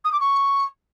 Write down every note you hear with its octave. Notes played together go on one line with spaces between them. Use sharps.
D#6
D6
C#6